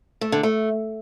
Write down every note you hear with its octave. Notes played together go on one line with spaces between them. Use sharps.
A3
D3
A3